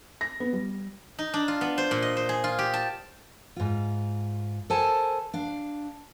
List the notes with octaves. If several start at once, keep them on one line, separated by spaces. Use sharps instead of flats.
A#6
B3
G3
D#4
D4
F4
B3
C5
A#2
D#5
C5
G#4
F4
G4
A5
G#2 F4
A4 A#4 C5 G#5 A5
D4 F5